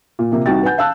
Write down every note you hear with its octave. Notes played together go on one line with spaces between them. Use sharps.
A#2
C3 F3 A#3
C2 D#4 F#4 G5 A6
B4 F#5 G#5 G6
F5 A5 E6 F#6